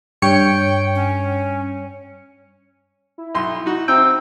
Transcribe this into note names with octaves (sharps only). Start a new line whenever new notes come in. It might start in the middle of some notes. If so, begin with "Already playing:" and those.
G2 C#5 G5 C#7
C#4
E4
B1 C6
D#4 F#4
C4 D#4 G5 E6